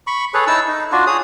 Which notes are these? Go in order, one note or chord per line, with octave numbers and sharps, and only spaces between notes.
B5 C#6
G#4 A4 B4 C#5
D#4 E4 A5 E6
D#4
D4 F4 F#4
G#4 C#5 D#6